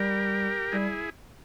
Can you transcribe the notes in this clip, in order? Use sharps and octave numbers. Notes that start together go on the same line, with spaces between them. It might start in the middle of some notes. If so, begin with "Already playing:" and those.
Already playing: G3 G4 A#4
G3 E4 G#4